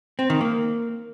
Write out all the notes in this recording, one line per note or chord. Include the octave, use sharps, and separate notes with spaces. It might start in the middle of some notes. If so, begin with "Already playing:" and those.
C4
D#3
A#3